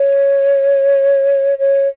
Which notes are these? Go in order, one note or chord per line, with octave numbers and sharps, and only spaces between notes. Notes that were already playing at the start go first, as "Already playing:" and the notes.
Already playing: C#5
C#5